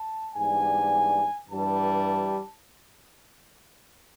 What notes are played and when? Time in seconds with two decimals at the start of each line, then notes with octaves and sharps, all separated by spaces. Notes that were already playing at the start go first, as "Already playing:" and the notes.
Already playing: A5
0.35 G#2 E3 G3 B3 D4 G#5
1.48 G2 E3 G3 A5